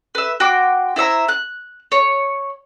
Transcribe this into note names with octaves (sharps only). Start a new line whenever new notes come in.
B4 E5
F#4 G5 C6 D6
E4 C5 E5 A#5
F#6
C#5